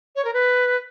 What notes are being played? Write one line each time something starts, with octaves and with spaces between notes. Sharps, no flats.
C#5
A#4
B4